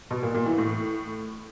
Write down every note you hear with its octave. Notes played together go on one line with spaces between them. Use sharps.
B2
A#2
A#2
E3
A2